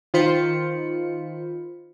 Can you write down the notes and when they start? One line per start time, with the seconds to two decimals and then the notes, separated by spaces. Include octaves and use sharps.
0.14 D#3 F4 C5 B5 C#7